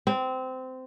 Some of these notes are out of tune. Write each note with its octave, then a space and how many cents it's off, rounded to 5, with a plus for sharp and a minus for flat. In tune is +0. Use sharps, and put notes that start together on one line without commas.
C4 -20